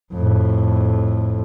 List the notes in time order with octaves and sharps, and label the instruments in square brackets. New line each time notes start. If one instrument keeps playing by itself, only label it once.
[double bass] F2 A2